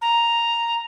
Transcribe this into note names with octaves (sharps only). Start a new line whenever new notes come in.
A#5